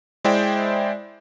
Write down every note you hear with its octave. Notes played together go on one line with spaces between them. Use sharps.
G#3 E4 C5 D5 E5 G5